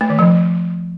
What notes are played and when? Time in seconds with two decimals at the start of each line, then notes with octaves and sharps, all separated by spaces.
0.01 A3
0.10 D#3
0.19 F3